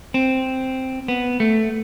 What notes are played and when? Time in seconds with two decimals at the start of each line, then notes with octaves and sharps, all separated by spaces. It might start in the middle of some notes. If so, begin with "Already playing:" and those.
0.14 C4
1.08 B3
1.40 A3